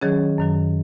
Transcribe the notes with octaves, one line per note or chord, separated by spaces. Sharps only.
D#3 F#3 C#4 G#4 C#5
F#2 D#3 F#3